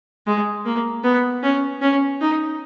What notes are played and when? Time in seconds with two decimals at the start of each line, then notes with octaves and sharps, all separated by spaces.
0.27 G#3
0.65 A#3
1.04 B3
1.43 C#4
1.82 C#4
2.21 D#4